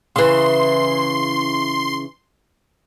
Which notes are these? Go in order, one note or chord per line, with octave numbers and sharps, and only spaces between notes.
C#3 E3 C6